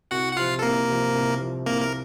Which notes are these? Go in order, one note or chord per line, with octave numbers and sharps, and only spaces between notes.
C2 F#4 F#5
F#5
C3 F3 F4 F5
A4
C2 A#3 A#4
C3 F3
C2
C3 F3
C2 A#3 A#4
A#4